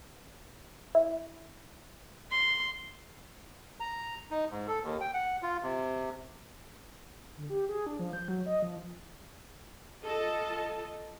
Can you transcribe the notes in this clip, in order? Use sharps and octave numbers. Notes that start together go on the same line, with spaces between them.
E4
C6
A#5
D#4
G#2
A4
D#2
G5
F#5
F4
C3
D3
G4
G#4
D4
F3
G6
F#3
D#5
F3
F4 A4 D#5 A5